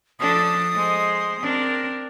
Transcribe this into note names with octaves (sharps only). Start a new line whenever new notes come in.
F3 D4 A4 D#6
G#3 C5
C4 D4 A#4